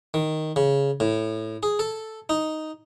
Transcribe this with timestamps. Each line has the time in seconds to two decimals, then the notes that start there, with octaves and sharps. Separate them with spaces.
0.14 D#3
0.56 C#3
1.00 A2
1.63 G#4
1.79 A4
2.29 D#4